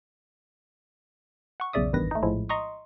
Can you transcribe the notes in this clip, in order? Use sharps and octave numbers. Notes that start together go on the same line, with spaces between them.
F#5 C#6
B1 E2 C#3 D5 E5 D#6
A1 E2 G2 D#3 B4 A#6
A3 D#4
A#1 A2 F3 G#3 E4
D#5 A#5 C6 C#6 D#6